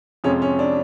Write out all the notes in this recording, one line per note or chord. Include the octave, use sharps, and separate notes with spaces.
F2 C3 F3 G#3 C#4
C#4
D4